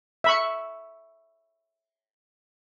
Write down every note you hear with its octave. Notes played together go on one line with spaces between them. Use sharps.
E5 B5 C#6